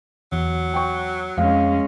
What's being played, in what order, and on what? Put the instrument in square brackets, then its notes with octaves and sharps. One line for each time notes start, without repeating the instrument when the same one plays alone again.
[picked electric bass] E2 [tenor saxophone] F#3
[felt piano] G5 C#6
[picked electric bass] F2 [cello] G#3 C#4 [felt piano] F5